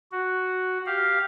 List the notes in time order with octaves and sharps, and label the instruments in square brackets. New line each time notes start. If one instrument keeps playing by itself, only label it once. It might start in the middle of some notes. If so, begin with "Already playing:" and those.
[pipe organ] F#4
G4 F5